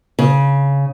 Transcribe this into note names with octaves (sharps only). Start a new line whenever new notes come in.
C#3